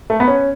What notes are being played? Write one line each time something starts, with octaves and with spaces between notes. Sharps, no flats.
A3
B3
C#4